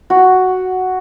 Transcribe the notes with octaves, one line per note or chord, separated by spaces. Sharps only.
F#4